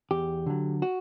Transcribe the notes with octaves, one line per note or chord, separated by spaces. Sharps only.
E2 G4
D3 F#3
F#4